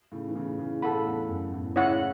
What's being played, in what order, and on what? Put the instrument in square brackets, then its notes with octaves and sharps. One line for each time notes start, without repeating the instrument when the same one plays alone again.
[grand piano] A2 C#3
E3
A2 C#3
A2 C#3
[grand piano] A2 C#3 [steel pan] A4 F#5 B5
[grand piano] E2 A2
F#2
E2 A2
[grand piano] A2 C#3 [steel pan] E4 C#5 F#5